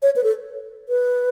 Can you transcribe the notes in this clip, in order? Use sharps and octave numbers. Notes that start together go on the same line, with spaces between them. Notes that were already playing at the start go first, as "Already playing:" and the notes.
C#5
B4
A4
B4